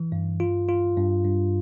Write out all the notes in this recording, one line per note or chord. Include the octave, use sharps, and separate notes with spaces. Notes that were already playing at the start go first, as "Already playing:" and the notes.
Already playing: E3
G2
F4
F4
G2
G2